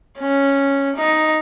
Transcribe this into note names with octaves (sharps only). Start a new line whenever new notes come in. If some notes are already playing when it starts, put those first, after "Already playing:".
C#4
D#4